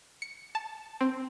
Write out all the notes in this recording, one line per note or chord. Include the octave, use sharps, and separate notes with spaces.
C#7
A5
C4